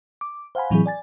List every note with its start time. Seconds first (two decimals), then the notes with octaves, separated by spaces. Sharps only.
0.21 D6
0.55 C5 F5 F#5 G#5 B5
0.70 A2 E3 F#3 C4 E4 G#4
0.86 D5 G#5 A6